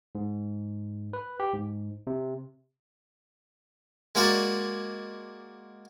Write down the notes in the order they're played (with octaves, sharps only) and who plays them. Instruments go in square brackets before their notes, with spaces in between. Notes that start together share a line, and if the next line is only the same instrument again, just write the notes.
[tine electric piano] G#2
B4
G4
G#2
C3
[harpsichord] G#3 A#3 F#4 C#5 D5